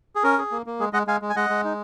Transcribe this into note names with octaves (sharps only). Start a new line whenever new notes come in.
G#4
C#4 A#4
G#4
A#3
A#3
G#3 G#4
G#3 D#5 F#5
G#3 F5 G#5
G#3
G#5
G#3 D#5 F#5
G#3
D#4